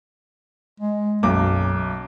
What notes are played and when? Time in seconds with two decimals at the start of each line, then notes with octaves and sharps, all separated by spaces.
0.80 G#3
1.23 B1 F#2 D6